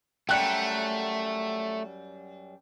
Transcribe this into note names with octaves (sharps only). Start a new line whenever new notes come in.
F#2 G3 A3 G5 F#6 C#7